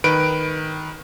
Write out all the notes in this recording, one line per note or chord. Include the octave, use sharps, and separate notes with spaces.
D#3 B4 D7